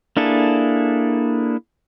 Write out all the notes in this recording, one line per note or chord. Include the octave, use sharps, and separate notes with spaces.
A#3 D4 E4 G#4 A4